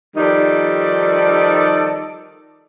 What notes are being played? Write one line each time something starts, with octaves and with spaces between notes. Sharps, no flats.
D#3 F3 G3 D#4 A4 D5